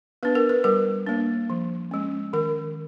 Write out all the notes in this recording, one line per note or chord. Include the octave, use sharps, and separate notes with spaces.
B3 D4 B4
A#4
B4
G3 A#4
A#3 D4
F3
G#3 C#4
D#3 A#4